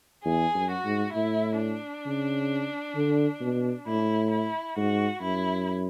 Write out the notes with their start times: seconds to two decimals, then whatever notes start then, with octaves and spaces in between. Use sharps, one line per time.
0.24 E2 G#4
0.55 F#2
0.70 F#4
0.85 G#2
1.14 A2 E4
1.59 D4
2.06 C#3
2.95 D3
3.41 B2
3.86 A2 E4
4.30 E4
4.76 G#2 F#4
5.21 F#2 E4